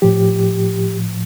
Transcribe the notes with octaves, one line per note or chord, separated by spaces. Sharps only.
A2 F3 G4